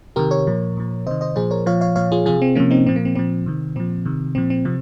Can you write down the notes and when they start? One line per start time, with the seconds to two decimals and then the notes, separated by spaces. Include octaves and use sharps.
0.16 C3 D#3 G4 A#4
0.31 A#4 C#5
0.47 A#2 F3
0.77 A#2 F3
1.07 C3 D#3 C5 D#5
1.21 C5 D#5
1.36 A#2 F3 G#4 C5
1.51 A#4 C#5
1.66 A#2 F3 C#5 F5
1.81 C#5 F5
1.96 A#2 F3 C#5 F5
2.12 F4 G#4
2.26 C3 F3 F4 G#4
2.42 C4
2.55 C3 F3 A#3 C#4
2.71 C4 D#4
2.86 A#2 F3 C4
2.96 A#3
3.05 C4
3.15 A#2 F3 C4
3.46 C3 D#3
3.76 A#2 F3 C4
4.06 C3 D#3
4.35 A#2 F3 C4
4.50 C4
4.65 C3 F3